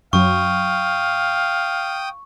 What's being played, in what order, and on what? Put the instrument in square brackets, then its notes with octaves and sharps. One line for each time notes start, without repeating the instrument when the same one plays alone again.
[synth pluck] F#2 F#3 [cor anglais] F5 [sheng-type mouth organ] G5 D#6 [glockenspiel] C#6